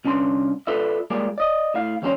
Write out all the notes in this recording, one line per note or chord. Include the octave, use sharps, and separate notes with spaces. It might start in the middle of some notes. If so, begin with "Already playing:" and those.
C2 C#4 D4 A5 C6
F4 A4 B4 D5 E5
G3 G#3 A#3 F4 G#4 D5
D5 D#5
A2 E4 F5
D#2 F3 G3 G#3 C#4 C5